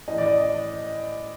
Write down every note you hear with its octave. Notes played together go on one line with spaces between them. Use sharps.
A2 E3 D#5
D5
D#5